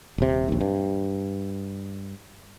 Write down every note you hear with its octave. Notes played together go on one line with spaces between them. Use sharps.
D#1 C3
A#1 D#2
G2